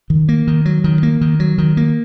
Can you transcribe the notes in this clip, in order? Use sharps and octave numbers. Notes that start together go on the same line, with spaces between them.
D#3
A#3
D#3
F#3
D#3
A#3
D#3
F#3
D#3
A#3